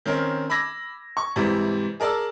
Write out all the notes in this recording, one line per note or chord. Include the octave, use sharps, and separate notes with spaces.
D#3 C4 C#4 A#4
B5 D6 E6 G#6 A#6
C#6
G#2 C3 E3 G3 E4
G#4 A#4 D5 A5 E6